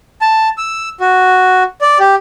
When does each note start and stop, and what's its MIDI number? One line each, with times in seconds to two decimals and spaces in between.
0.21 0.49 81
0.58 0.89 88
1.00 1.63 66
1.81 1.98 74
2.00 2.15 67